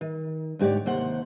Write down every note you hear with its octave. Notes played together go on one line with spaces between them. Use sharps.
D#3
D2 G#2 G4 C#5 D5
D#2 C3 C5 F#5